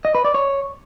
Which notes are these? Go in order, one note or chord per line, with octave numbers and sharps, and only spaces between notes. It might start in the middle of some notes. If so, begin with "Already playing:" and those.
D#5
B4
D5
C#5